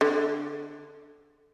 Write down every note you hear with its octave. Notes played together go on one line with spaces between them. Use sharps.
D3